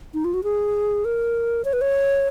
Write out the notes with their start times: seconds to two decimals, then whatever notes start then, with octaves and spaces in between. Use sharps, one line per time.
0.14 D#4
0.24 F4
0.34 F#4
0.44 G#4
1.05 A#4
1.65 C#5
1.73 B4
1.81 C#5